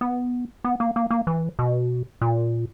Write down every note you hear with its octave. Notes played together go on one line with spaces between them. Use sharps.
B3
B3
A#3
A#3
A#3
E3
B2
A#2